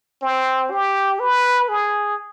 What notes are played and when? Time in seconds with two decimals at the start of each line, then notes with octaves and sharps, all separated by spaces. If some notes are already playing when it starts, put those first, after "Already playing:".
0.22 C4
0.71 G4
1.20 B4
1.69 G#4